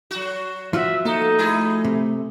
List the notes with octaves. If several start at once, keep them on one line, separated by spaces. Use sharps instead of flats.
F#3 F#4
F3 F4 F#4 E5
A#3 D#4 A4 E5
A3 E4 G#4 A4
C3